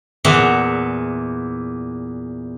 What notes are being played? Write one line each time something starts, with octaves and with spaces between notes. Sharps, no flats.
E2 A#2 E3 F#5